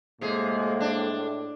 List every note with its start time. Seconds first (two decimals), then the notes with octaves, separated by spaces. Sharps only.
0.21 A2 C3 G#3 A#3 G#4
0.80 D4